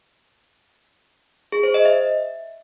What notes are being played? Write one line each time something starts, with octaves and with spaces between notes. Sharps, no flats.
G#4
C5
D#5
E5